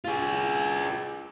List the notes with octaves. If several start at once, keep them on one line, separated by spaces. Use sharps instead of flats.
F4 G#4